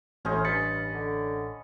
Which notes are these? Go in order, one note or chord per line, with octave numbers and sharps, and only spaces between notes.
A1 A2 C#4 C5 D#5
G2 B5 A6 C#7
D3